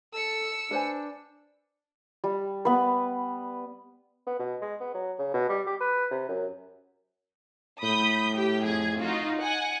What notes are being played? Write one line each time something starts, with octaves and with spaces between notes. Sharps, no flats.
A4 E6 C#7
D4 B4 C5 G#5
G3
B3 B4
B3
B2
G#3
B3
F#3
C#3
B2
G3
G4
B4
C3
F#2
A2 B5 D#6 G6
G4 G5
F2 G#4 G#6
D#4 F4 F#4
F#5 G#5